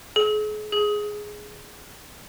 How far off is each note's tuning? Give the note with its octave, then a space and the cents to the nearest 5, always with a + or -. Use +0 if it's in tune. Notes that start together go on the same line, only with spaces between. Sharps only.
G#4 +40
G#4 +5